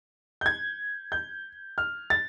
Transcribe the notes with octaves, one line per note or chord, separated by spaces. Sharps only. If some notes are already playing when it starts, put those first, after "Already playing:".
G6
G#6
G6
F6
A6